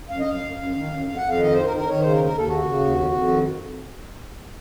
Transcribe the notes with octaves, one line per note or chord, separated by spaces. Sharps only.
F#2 F5
D#5
F#2 F5
F#2
F#2
D#3
F#2
F2 F5
F2 F#5
F5
D#3 D#5
D#3 C5
A#4
D#3
A#4
D#3 C#5
C#3 C5
A#4
D#2
A#4
D#2 A4
C#3 F#4
C#3
D#2
F2
F2
D#3